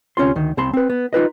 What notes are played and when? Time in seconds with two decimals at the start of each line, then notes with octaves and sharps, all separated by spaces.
0.17 D2 C3 C#4 F4 C6
0.36 D2 D#3
0.57 C2 C3 A#3 A5 B5 C6
0.73 C4 B4
0.90 B3
1.13 D#4 F4 B4 D#5